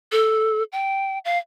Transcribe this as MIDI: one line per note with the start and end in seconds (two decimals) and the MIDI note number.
0.12 0.63 69
0.72 1.19 79
1.25 1.38 77